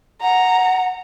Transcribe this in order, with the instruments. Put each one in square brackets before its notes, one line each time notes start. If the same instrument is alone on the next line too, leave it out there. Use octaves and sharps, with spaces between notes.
[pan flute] F#5 [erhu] A#5